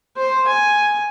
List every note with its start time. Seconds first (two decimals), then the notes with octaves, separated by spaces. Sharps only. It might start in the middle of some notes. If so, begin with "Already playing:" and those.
0.18 C5
0.48 G#5